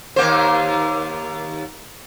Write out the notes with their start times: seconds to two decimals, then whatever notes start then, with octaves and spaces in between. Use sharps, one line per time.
0.16 D#2 A#3 C5